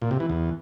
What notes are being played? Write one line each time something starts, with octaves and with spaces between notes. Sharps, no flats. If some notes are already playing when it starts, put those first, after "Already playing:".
A#2
C3
E3
E2